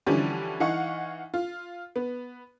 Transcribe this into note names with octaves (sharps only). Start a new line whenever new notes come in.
D3 E3 F3 G3 C#4 D4
E3 D#4 F5 F#5 C#6
F4
B3